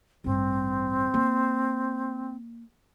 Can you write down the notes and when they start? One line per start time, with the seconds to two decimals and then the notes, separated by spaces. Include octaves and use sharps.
0.24 A1 G2 C4
1.14 A#3